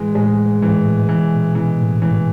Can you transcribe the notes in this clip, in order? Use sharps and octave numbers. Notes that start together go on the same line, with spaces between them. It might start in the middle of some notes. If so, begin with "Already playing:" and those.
Already playing: A2 E3 G#3
A2 G#3
G#2 E3
A2
B2 E3
A#2
B2 E3
A2
G#2 E3